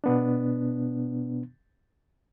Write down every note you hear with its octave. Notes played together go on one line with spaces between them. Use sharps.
B2 B3 D4